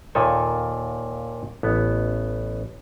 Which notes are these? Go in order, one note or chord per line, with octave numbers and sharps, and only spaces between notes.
D#2 A#2 D#3 A4 G#5
A1 B3